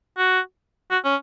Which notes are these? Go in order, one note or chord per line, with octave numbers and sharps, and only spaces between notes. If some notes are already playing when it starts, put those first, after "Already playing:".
F#4
F#4
C#4